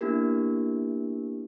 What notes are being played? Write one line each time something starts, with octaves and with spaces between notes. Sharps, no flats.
A#3 B3 D4 E4 G4 A#4